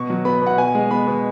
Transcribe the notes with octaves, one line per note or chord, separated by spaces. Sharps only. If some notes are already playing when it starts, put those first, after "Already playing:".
Already playing: B2 C#6
F#3
B3 B5
B2 F#5
B2 G#5
G#3
B3 B5
B2